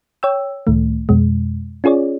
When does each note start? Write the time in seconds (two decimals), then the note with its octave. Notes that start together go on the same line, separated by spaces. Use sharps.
0.23 C#5 G5 E6
0.67 C#2 A2 D#3 A3
1.09 F2 B2 G#3
1.84 C#4 F4 G#4 C#5 D5